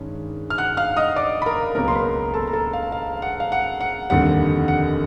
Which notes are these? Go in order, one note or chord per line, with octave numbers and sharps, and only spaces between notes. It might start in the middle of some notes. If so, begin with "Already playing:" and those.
Already playing: G2 D#3 G#3 C#4
F6
F#5 F#6
F5 F6
D#5 D#6
D5 D6
B5
A#4 A#5
C#2 B2 F#3 A#3 A#4 A#5
C6
B4 B5
A4 A5
A#5
A4 A5
F5
F5
F#5
F5
F#5
F#5
F1 D#2 D3 G3 F#5
F#5